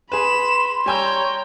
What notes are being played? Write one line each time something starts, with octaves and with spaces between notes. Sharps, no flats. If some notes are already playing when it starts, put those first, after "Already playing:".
G#4 B4 B5 C6 E7
G3 C#5 G5 G#5 A#5 E6